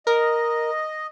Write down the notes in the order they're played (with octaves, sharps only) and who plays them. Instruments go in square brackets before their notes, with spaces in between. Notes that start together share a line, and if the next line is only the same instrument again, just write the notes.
[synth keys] A#4 [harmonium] D#5